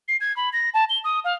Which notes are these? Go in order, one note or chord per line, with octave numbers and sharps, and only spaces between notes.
C7
G#6
B5
A#6
A5
G7
D#6
F5